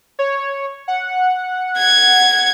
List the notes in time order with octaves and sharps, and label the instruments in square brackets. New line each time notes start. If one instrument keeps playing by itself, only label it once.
[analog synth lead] C#5
F#5
[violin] G#6